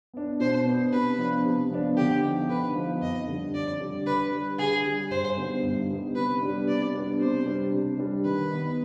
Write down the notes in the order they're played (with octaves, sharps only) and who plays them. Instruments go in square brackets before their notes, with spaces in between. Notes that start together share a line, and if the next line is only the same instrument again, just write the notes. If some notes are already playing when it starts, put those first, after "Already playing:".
[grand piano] B3 D4
[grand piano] B2 [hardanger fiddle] C5
[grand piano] B3 D4
[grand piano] C3 [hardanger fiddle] B4
[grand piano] F3 B3 D4
C3
F3 B3 D4
[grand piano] D3 [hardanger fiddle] G4
[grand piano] F3 B3 D#4
[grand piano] D3 [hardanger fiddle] B4
[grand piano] F3 B3 D#4
[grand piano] F2 [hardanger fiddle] D#5
[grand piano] D3 G3 D4
[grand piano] F2 [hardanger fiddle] D5
[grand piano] D3 G3 D4
[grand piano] D3 [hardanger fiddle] B4
[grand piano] G3 D4
[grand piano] D3 [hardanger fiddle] G#4
[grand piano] G3 D4
[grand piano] G2 [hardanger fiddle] C5
[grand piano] D3 G3 B3 D#4
G2
D3 G3 B3 D#4
[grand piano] C3 [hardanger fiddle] B4
[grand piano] G3 B3 D4
[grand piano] C3 [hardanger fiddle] D5
[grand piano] G3 B3 D4
[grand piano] C3 [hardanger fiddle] C5
[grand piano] G3 D4
C3
G3 D4
[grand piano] D#3 [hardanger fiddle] B4
[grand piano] B3 D#4